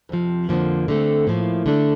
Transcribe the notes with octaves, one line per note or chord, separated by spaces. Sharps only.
F2 C3 F3
F2 D3 F3 A#3
D3 A3 C4
A2 F3 A#3
D3 A3 D4